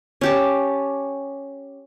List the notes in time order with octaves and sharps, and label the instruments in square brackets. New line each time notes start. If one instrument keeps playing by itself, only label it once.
[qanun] C#4 G4 A5